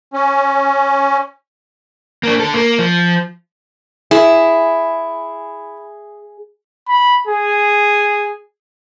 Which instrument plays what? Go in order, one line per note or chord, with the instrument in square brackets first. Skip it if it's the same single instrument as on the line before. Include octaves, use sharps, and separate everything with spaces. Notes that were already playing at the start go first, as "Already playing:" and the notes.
[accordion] C#4
[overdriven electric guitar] A#3 D4
D3 A4
A#3
F3
[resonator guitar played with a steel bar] E4 [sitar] G#4
[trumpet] B5
G#4